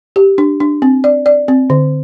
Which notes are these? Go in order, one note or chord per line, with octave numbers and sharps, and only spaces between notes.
G4
D4
D4
C4
D5
D5
C4
D3